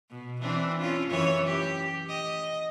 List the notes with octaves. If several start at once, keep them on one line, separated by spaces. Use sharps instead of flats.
B2
E3 C4 D4
C#4 F4
F#2 E3 C#5
G4
D#5